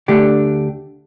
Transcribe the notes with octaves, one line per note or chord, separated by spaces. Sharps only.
D2 D3 A3 D4 G4